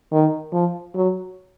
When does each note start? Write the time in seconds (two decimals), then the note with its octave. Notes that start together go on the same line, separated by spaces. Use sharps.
0.12 D#3
0.52 F3
0.94 F#3